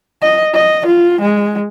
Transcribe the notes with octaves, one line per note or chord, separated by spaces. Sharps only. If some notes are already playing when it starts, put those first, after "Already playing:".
D#5
D#5
F4
G#3